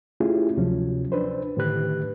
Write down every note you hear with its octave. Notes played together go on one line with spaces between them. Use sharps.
A3 C#4 E4 F4 G4 G#4
D2 C3 F3 F#3 C#4
D4 B4 C5
A2 D3 D#3 G4 B4 F#6